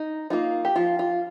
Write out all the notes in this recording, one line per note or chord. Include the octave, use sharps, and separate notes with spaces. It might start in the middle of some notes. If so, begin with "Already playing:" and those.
Already playing: D#4
A#3 D#4 F4
G4
F3 F4
F4